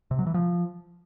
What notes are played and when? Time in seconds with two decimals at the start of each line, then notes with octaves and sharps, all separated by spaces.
0.11 C3
0.19 F#3
0.27 E3
0.34 F3